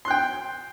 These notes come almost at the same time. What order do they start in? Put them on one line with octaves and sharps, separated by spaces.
C6 F#6 G5